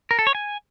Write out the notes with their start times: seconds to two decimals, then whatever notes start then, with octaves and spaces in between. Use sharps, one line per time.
0.11 A#4
0.19 A4
0.27 C#5
0.35 G#5